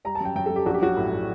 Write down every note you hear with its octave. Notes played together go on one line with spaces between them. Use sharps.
G3 A#5
A5
F#2 G5
F#2 G5
A4
F#2
G4
A#1 F#4
G4
F#3 F#4
A2
A2